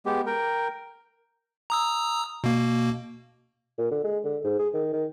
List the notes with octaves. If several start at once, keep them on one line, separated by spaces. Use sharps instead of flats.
G#3 B3 G4
A#4 G5
A#5 D#6 E6
B2 A#3
A#2
D3
G#3
D3
G#2
G#4
D#3
D#3